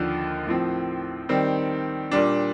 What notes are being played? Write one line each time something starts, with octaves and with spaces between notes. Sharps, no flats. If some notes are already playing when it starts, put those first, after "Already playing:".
Already playing: D#2 D3 F3
A2 F3 C4
D#3 G3 C4
A#2 G3 D4